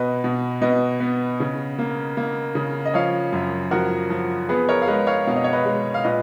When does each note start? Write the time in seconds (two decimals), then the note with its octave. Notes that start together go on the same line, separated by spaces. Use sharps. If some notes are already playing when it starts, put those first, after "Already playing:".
Already playing: B2 B4 D#5
0.24 B2
0.61 B2 B4 D#5
1.00 B3
1.40 C#3
1.79 A#3
2.17 A#3
2.55 C#3
2.85 D#5
2.94 F3 C#5 F5
3.32 F#2
3.71 F3 F#4 A#4
4.10 F3
4.49 B3 G#4 B4
4.69 A#4 C#5
4.82 F5
4.87 G#3 B4 D#5
5.07 C#5 F5
5.27 B2 F5
5.36 D#5
5.44 C#5
5.53 B4 D#5
5.66 G#3
5.94 F5
6.04 A#2 B4 D#5